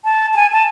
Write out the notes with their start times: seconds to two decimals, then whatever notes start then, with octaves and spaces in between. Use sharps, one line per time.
0.04 A5
0.33 A5
0.36 G#5
0.53 A5